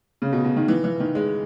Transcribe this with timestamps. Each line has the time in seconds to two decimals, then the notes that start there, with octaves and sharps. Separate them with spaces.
0.22 C#3
0.33 B2
0.44 B2
0.56 D#3
0.68 E3
0.84 E3
1.00 D#3
1.15 G#3